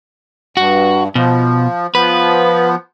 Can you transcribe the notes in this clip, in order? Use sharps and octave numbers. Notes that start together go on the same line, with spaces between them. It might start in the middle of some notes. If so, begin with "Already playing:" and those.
G2 F#4
B2 F3
F3 B3 B4